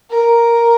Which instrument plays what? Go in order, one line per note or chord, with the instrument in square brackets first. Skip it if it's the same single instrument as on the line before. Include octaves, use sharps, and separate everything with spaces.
[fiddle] A#4